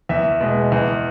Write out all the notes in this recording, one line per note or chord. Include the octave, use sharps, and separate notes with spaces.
E2 E5
B2 G#3
E2